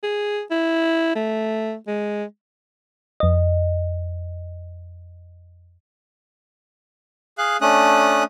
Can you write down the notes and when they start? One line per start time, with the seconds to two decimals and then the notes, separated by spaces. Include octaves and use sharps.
0.03 G#4
0.51 E4
1.15 A3
1.88 G#3
3.20 F2 D#5
7.38 G#4 F5 F#6
7.61 A3 C#4 D4 D#6 F#6